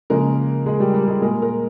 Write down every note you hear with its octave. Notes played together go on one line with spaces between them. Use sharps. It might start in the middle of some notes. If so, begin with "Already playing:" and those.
C#3 F3 G#3 A#3 A#4
G#3 G#4
G3 G4
G3 G4
G#3 G#4
A#2 G#3 A#4
A#4